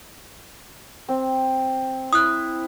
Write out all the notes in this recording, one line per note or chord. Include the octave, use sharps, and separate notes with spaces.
C4
E4 D#6 F#6